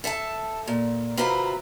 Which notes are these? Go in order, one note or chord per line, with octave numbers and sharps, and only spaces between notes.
A4 E5 G#5 A5
A#2
C3 F4 F#4 A#4 B4 E5